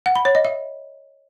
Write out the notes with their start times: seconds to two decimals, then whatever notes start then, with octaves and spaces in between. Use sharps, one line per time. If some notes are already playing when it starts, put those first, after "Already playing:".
0.06 F#5
0.15 B5
0.25 C#5
0.35 D#5
0.45 E5